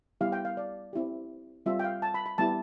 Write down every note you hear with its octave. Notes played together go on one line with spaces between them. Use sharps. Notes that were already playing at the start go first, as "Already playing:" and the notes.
G3 B3 E4 G4 F5
G5
F5
D5
C4 E4 G4
G3 C4 F4 E5
G5
F5
A5
B5
B5
G3 B3 E4 G4 A5